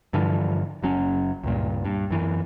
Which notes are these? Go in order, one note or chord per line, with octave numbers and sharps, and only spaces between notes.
G2 D3 E3 F3
F#1 F#3 C#4
C#2 G2 A#2
G2
F#2 E3